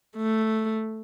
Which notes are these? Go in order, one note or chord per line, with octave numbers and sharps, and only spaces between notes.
A3